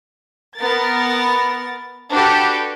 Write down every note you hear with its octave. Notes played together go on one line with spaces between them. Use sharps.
B3 A#4 A6
D4 F#4 G4 A4 B4